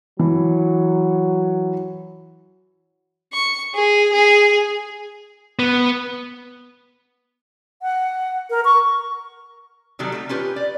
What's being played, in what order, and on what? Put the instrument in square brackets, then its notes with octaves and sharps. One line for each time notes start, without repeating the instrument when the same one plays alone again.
[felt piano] E3 [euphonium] F#3
[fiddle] C#6
G#4
G#4
[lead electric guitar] B3
[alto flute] F#5
A#4
C#6
[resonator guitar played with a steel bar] C3 D#3 F#3 G3 A4
A3 D#4
C#4 F4 G4 B4
D5